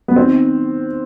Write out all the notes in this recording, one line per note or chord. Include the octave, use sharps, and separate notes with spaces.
B3
D#3 C4